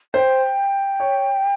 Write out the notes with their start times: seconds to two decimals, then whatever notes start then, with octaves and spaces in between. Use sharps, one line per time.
0.14 C5 G5
1.00 C#5